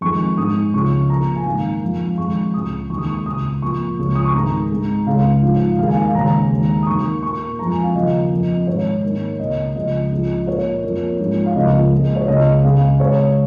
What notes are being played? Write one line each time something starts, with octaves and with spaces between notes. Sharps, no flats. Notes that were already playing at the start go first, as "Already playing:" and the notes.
F2 D#3 G#3 C#6
G#2 G#3 D#6
C#2 C#3 F3 G#3 C#6
A#2 F3 A#3 A#5
G#5
G#2 D#3 A#3 F5
F2 F3 G#3
F2 D#3 G#3 C#6
C#2 C#3 G#3 D#6
D#2 D#3 G#3 C#6
D#6
C#6
C#2 C#3 G#3 D#6
A#2 F3 A#3 C#6
C#2 C#3 F3
D#6
C#6
G#2 D#3 G#3 A#5
G#2 G#3
C#2 C#3 G#3 F5
G#2 F3 G#3
D#2 D#3 G#3 F5
G#5
F5
D#2 C#3 G#3 A#5
D#2 D#3 G#3
D#6
D#2 D#3 A#3 C#6
A#2 A#3 C#6
F2 F3 G#3 A#5
G#5
F5
D#2 C#3 F3 A#3 D#5
F2 F3 A#3
G#2 D#3 G#3 C#5
G#2 D#3 A#3
C#2 C#3 A#3 D#5
C#2 C#3 F3 G#3 D#5
C#2 C#3 F3 G#3
A#2 A#3 C#5
F2 F3 A#3
G#2 F3 G#3
F5
C#2 C#3 F3 A#3 D#5
A#2 G#3
C#5
C#2 C#3 A#3 D#5
C#2 C#3 G#3 F5
C#2 C#3 G#3 C#5